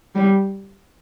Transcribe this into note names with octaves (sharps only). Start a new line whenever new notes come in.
G3